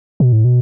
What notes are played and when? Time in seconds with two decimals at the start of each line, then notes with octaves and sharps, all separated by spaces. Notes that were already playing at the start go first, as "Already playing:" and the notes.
0.20 B2
0.32 A2
0.45 B2